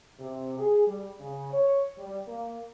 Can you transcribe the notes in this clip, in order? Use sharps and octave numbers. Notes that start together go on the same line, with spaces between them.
C3
G#4
G3
C#3
C#5
G3
A#3